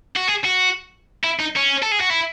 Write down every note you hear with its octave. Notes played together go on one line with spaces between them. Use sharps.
F#4
G#4
F#4
E4
D#4
C#4
A4
G#4
F#4
E4